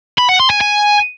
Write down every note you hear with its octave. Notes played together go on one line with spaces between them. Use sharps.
B5
F#5
C6
G#5
G#5